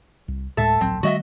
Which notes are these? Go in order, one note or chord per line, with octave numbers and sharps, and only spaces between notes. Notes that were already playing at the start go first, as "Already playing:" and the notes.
C2
D2 A2 G#3 A4 E5
D1 A#1 F#3 C4
D#3 G3 A3 F#4 D#5 E5